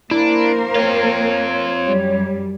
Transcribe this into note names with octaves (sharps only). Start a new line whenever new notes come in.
A#3 D4 E4 A#4 C5
C4 F4 C#5
F#2 G3